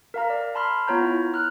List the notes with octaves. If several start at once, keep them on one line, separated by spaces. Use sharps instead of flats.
A#4 F5 A#5
D5
A5 B5 C6 F6
B3 F4 C#5 A#5 G6
E4
F6 F#6